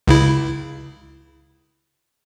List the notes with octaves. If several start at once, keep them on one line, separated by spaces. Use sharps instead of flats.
C#2 C#3 E4